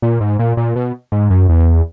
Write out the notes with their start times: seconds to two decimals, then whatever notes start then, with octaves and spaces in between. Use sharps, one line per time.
0.02 A#2
0.20 G#2
0.39 A#2
0.57 A#2
0.76 B2
1.12 G#2
1.30 F#2
1.49 E2